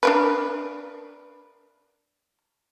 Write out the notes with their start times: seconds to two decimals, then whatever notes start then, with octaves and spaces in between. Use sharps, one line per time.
0.03 D4 A#4 B4